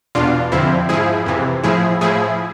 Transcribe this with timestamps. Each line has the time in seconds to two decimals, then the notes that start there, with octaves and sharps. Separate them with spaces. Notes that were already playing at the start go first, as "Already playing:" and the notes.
0.15 E2 B2 D4 F4
0.52 F2 D3 F3 C4 E4
0.89 G#2 F3 E4 G#4
1.26 F2 C3 E3
1.64 A2 F3 E4 G#4
2.01 A2 F3 E4 G#4